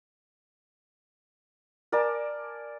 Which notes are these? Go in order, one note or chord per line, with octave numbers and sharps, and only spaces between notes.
A#4 D5 G#5 A5